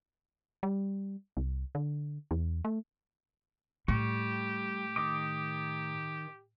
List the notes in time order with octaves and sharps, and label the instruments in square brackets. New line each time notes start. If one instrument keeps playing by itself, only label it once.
[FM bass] G3
C2
D3
E2
A3
[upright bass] A2 [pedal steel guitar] G3 C#6 [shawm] G4
[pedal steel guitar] D#3 D#5 D6